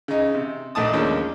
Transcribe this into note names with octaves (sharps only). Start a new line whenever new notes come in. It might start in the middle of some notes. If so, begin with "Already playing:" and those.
C#3 D#4
C3
A#1 A3 D#4 A5 D#6
D#2 F3 G#3 A#3 C#4 D4